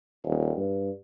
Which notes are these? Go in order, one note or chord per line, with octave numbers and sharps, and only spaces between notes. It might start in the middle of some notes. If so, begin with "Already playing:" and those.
D#1
G2